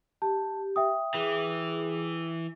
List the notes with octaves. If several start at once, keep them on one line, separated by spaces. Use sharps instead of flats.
G4 A5
E5 G5 D#6
E3 G#4 D6